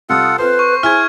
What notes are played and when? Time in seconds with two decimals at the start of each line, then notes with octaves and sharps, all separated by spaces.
0.10 C3 G3 F4 A4 F#5 D#6
0.38 C4 F4 A4 B4 C5
0.59 C#6
0.83 E4 G#4 C5 G#5 F6 G#6